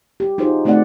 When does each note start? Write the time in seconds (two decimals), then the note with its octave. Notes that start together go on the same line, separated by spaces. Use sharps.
0.20 G4
0.38 D#4 F4 F#4 G#4 C5
0.65 A3 C4 D#4 F#4 D5 F#5